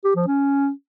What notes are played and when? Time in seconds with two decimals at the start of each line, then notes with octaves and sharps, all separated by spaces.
0.04 G4
0.16 F3
0.27 C#4